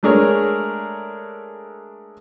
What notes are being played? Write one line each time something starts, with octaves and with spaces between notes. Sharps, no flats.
G#3 A3 D4 G#4 A#4 C#5